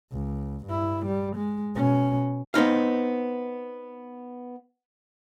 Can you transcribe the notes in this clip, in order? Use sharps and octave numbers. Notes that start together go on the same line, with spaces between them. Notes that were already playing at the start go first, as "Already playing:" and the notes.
C#2
G2 E4
G3
G#3
B2 C#4
B3 C4 D#4 F5